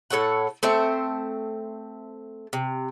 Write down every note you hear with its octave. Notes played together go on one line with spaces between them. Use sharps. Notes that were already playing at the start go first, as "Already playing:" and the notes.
A2 A4 C#5 F#5
A3 C4 C5 E5
C3